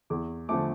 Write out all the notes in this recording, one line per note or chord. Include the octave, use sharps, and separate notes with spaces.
E2 D6
D3 F3 A3 D6